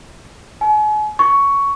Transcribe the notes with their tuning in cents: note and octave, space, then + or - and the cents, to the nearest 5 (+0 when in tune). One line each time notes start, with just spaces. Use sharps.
G#5 +40
C#6 +10